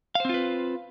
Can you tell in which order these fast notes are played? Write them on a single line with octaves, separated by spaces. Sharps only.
F5 C5 C4 F4 B4